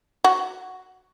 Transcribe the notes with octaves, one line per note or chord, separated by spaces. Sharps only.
F#4